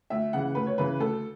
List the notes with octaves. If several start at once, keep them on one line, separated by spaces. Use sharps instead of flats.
D2 E5
C#3 E3 F#5
D2 B4
C#5
C#3 E3 B4
D2 A4